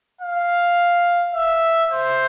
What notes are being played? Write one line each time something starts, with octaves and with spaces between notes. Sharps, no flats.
F5
E5
C5